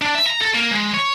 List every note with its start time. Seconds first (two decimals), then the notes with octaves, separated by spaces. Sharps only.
0.02 D4
0.15 E5
0.26 A#5
0.41 A4
0.55 A#3
0.72 G#3
0.94 C#5